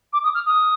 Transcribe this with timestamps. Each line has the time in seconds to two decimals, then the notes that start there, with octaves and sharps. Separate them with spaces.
0.13 D6
0.24 D#6
0.34 F6
0.46 D#6